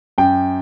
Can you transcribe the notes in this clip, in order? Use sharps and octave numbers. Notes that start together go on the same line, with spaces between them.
F#2 G5